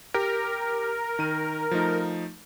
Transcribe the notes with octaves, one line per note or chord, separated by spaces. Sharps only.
G4 A#4
D#3 D#7
F3 A3 D#4